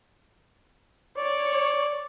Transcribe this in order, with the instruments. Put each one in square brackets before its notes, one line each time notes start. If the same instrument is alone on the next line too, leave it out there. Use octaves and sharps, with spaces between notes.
[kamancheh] C#5 [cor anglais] D5